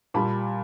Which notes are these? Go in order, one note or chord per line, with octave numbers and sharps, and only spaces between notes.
A#2 G3 A5 B5